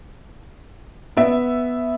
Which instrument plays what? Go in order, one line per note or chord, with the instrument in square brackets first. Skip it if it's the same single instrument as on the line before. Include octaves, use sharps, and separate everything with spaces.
[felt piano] B3 E5